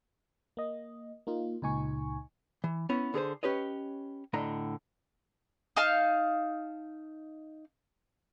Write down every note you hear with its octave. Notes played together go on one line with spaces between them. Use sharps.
A#3 D#5
A#3 D#4 F4
C#2 A#2 D#4 G#5 C#6
E3
B3 C#4 E4 C#5
D3 G#4 A#4 C5
C#4 G4 B4 C#5 D#5
D2 A2 D3 D#5 A#5
D#4 F5 A5 F6